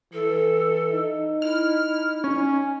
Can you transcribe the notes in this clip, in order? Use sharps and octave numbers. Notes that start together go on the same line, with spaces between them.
E3 A4
D#4
E4 F6
C#4